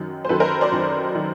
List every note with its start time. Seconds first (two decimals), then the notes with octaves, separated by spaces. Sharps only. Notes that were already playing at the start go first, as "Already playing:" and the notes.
Already playing: F#2 D#3 F#3
0.25 C5
0.29 F#2 D#3 F#3 A4 B4
0.40 A#4 C5
0.61 C5 D5
0.72 F#2 D#3 F#3
1.15 D#3 F#3